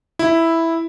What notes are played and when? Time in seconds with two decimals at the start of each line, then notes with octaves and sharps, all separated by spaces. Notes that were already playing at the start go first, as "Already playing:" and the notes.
0.19 E4